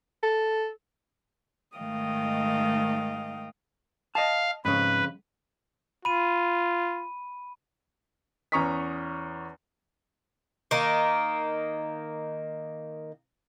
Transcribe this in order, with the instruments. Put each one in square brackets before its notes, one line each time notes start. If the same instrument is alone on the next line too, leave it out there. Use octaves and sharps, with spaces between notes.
[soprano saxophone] A4
[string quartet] G#2 D#3 A3 D#5 F5 G5
[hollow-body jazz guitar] D#5 A5 [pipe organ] F5
[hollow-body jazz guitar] F2 C#3 [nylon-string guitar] G#2 [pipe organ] B4
[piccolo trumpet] F4 [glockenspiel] B5 D#7
[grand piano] E2 C#4 A#5 C#6 D#6 B6
[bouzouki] D#3 A#3 D#4